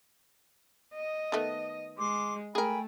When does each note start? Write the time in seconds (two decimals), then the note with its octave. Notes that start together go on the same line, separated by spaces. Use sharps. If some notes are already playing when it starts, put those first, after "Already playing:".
0.95 D#5
1.32 D#3 A3 B3
1.98 G#3 C6 D6
2.55 A3 G#4 A#4 G5 G#5 B5